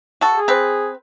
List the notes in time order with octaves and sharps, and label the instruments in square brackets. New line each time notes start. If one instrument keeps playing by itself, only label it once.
[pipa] F#4 A4
[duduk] G#4
[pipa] C4 B4